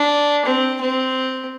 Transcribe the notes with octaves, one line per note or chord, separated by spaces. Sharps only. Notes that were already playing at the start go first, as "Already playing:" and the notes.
Already playing: D4
C4
C4